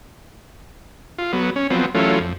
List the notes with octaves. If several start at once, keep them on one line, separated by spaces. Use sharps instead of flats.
F4
F#3 B3
C#4
F3 F#3 B3 C4
E3 F#3 A3 C#4 F4
F2